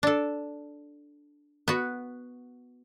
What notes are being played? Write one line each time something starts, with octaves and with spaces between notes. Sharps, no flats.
D4 A4
B3 F#4